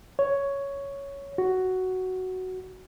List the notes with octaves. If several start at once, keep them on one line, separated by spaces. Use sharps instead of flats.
C#5
F#4